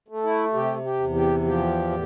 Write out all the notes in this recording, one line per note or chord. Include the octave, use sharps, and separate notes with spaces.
A3
E4
C3 G4
G4
E2
G4
F3 G4
A2